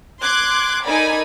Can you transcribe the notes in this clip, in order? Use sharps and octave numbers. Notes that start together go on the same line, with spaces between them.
C6 D6 F#6 G#6
D#4 A4 A#4 D5 G#5 B5